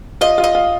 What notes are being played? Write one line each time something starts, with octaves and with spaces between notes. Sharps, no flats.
F4 D#5
F4
D#5
F4